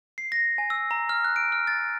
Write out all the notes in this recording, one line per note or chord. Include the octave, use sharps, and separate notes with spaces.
C7
A#6
G#5
E6
A#5
F6
F#6
D7
F6
A6